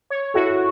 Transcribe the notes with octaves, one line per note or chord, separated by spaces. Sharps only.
C#5
E4 F#4 A4